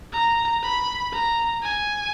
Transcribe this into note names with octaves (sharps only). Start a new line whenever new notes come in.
A#5
B5
A#5
G#5